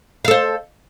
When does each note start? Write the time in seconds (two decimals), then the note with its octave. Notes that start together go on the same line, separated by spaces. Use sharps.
0.25 F5
0.28 A4
0.31 C5